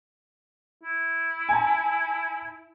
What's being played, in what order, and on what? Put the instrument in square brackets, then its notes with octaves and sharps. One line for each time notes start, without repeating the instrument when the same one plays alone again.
[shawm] E4
[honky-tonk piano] G#5 A5